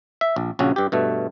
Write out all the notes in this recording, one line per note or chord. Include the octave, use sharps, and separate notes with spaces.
E5
A#1
A#1 C#3 C#4 F#4
G2 G4
G2 B2 A3